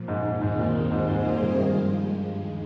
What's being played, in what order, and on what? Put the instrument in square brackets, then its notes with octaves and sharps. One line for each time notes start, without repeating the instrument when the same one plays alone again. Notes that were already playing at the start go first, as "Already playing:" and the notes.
Already playing: [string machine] A#2 F3
[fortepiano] G#2
[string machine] D#2 D#3 G#3 C4 D#4 [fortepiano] G#2
[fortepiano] G#2
A#2
[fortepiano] G#2 [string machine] G3 A#3 F4 G#4 C5
[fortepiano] G#2
A#2
A#2
C3
[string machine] G2 F3 G#3 [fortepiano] D#3
[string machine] D#2 D#3 G#3